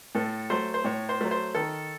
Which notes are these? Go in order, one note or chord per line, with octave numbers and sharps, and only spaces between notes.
A2 A4
F#3 A3 C5
C5
A2 C#5
C5
F#3 A3
C5
D#3 A4